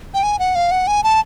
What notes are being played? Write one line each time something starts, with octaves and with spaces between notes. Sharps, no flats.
G5
G#5
F#5
F5
F#5
G#5
A5